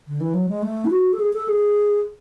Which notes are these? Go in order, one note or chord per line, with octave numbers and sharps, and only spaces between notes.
D3
E3
F#3
G#3
A3
E4
F#4
A4
G#4
A4
G#4